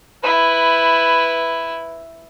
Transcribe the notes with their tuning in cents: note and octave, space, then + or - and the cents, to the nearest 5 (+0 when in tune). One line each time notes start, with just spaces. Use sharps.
E4 +0 B4 +10